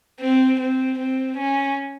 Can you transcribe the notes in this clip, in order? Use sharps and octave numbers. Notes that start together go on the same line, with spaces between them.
C4
C4
C4
C#4